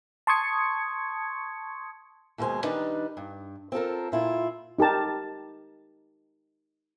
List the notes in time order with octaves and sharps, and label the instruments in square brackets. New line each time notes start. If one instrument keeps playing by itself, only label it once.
[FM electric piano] A5 C6 C#6 D#6 G#6 C#7
[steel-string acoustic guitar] D#2 B2 G#3 A4 C5 G#5
D#3 F#3 G3 D4 D#4 B4
G2
C4 F4 A4 A#4
A#2 E4 F4
[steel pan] D#4 G4 A#4 A5